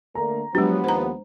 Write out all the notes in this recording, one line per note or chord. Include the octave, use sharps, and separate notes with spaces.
D3 A3 A#3 A#5
F3 F#3 G#3 B3 D4 G4
D#2 C5 A#5